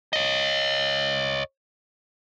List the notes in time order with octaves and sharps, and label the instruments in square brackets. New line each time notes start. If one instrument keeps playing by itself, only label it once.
[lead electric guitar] C#5 D#5